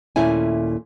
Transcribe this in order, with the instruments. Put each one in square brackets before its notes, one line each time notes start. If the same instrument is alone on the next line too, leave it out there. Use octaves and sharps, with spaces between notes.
[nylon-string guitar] D#2 A#2 A3 C#4 E4 G#5